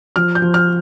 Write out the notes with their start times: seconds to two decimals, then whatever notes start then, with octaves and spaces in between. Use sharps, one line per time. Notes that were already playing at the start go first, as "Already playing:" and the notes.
0.16 F3 F6
0.35 G6
0.42 F3
0.54 F6